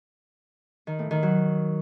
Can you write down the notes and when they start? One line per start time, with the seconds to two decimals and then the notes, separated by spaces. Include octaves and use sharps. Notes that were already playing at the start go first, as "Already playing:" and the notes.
0.87 D#3
0.99 A2
1.11 D#3
1.23 F#3